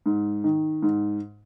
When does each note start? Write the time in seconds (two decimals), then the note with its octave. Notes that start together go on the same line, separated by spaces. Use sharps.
0.06 G#2
0.44 D#3
0.82 G#2